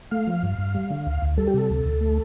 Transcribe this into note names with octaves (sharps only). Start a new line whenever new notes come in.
A3 F5
F3
G2
G2
G3
D3
D2
D2
G3 A4
G4
C3 A4
D2
D2
A3